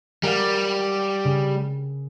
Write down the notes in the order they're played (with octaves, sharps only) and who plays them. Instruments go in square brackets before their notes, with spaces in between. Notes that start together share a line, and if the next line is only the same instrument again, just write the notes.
[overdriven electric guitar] G3 [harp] A#4 F5 F#5
[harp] C#3